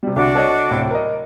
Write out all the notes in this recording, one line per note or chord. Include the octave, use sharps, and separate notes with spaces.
C3 G3
C2 D3 D4 F#4 D6
A4 C#5 D#5
D1 A2 C3
A#4 D#5